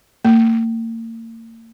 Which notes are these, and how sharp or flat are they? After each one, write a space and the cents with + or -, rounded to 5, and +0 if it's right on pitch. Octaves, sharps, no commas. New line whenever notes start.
A#3 -40